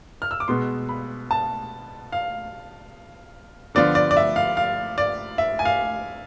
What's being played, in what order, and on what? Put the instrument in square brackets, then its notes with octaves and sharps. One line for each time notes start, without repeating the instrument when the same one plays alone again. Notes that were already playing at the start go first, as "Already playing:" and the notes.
[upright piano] F6
E6
D6
B2 G#3 B3 C6
B5
A5
F5
D3 F3 B3 F4 D5
D5
D5
E5
F5
F5
D5
E5
G#5
F5